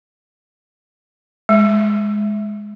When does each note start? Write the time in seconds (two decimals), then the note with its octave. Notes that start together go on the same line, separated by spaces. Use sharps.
1.49 G#3